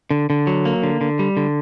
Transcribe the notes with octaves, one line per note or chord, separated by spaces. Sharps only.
D3
D3
F#3
A#3
D3
D3
G3
D3